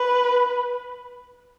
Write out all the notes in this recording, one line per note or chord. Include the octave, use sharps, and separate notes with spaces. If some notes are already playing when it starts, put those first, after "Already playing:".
Already playing: B4